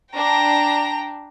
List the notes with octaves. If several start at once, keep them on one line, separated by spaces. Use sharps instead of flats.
D4 G5 A#5